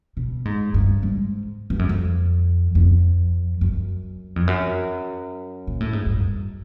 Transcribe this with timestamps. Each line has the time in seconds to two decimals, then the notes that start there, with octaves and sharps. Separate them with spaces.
0.17 B2
0.45 G#2
0.74 G2
1.03 G#2
1.70 G2
1.79 F#2
1.89 F2
2.75 F2
3.61 F#2
4.36 F2
4.47 F#2
5.67 A#2
5.80 A2
5.93 G#2
6.07 G2
6.20 F#2